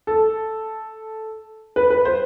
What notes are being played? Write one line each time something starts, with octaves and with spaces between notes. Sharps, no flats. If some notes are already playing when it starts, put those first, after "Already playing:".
A4
B4
B4
C5